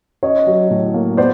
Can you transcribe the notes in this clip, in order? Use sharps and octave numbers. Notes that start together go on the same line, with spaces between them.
C#4 C#5 D#5
F#3
A2
A#3
B3 C5 D5